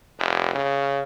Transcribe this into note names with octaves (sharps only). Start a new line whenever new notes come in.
F1
C#3